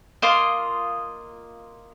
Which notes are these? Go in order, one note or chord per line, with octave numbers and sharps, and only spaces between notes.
A#3 F4 D#5 C6